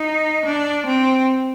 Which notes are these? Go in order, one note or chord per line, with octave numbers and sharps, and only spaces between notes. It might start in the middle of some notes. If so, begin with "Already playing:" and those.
Already playing: D#4
D4
C4